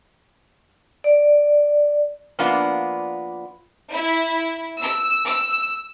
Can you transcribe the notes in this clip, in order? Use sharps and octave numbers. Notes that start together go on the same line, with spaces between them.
D5
F3 A#3 B3 D4 F4
E4
E6
E6